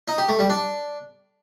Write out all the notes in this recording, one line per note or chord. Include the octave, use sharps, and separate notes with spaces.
D#4
G4
A3
G3
D4